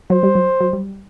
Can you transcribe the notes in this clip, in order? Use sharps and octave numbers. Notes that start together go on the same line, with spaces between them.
F#3 C5
G3
F#3
F#3
G3